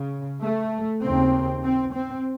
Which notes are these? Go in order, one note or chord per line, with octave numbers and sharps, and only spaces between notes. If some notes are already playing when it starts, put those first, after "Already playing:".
Already playing: C#3
A3
D#2 C#3 C4
C4
C4